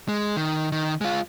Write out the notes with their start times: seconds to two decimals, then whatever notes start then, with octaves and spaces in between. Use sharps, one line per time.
0.09 G#3
0.37 D#3
0.72 D#3
1.01 G#3 F4